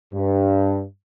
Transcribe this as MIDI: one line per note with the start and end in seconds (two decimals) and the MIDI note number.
0.14 0.82 43